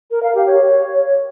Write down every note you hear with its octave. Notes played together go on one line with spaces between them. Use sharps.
A#4
F5
G4
C#5